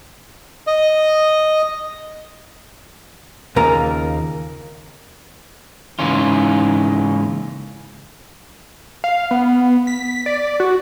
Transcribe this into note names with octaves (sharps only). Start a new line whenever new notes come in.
D#5
D#2 C#3 A#3 F4 A#4
G#2 C#3 E3 A#3 C#4 F4
F5
B3
B6
D5
F#4